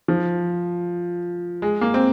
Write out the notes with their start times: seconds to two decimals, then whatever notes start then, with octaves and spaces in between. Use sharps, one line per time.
0.08 F3
1.62 G#3
1.81 A#3
1.94 C4